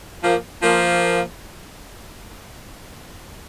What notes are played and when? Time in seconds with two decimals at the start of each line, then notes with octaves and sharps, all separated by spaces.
0.24 F3 A#3
0.63 F3 A#3